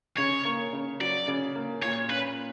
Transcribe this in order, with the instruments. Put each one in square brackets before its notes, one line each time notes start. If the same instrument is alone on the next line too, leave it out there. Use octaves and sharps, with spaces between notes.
[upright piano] C#3 [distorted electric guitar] C#5
[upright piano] A#3
C#3
[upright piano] F#3 [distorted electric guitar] D5
[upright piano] C#3
A#3
[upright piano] A#2 [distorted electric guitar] C#5
[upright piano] C#4 [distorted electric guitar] B4